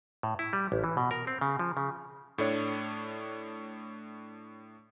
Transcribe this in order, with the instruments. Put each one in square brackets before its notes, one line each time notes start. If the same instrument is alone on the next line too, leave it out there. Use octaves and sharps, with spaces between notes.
[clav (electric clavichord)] A2
E4
G3
A1
E3
B2
A#4
C4
C#3
F3
C#3
[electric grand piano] A2 A3 D4 C#5